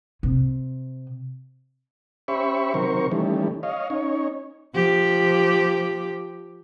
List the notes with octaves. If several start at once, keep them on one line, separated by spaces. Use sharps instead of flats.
C3
C#4 G4 C5 E5 B5 C#6
C3 D#3 F#3 A#4 C5 C#6
D#3 E3 G3 A3 C#4
C#5 D#5 F5
C#4 D#4 C#5
F3 G4